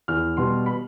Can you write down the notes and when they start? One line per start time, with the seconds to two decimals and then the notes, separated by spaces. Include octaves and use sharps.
0.08 E2 F6
0.37 B2 G3 C6
0.66 B5